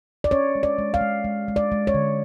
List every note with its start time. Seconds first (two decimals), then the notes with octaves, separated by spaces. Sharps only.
0.24 D5
0.31 C#4 C#5
0.55 G#3
0.63 D5
0.79 G#3
0.94 F5
1.01 G#3
1.24 G#3
1.48 G#3
1.56 D5
1.72 G#3
1.87 C#5
1.94 D3